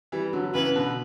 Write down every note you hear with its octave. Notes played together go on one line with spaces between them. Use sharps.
E3 G3
D3 F#3
C#3 E3 B4
B2 D3